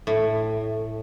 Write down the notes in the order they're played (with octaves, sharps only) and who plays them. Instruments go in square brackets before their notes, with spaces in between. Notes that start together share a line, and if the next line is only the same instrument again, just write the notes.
[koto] A2